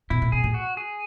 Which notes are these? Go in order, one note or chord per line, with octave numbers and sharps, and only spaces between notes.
B2 E4
A2
B2 G#4
A2
F#4
G#4